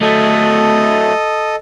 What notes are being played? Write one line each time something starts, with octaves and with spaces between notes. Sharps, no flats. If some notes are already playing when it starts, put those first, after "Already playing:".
F#3 A3 A4 D#5 D#6